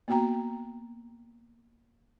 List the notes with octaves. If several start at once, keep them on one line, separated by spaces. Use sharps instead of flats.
A#3 B3 F#4 G5 A#5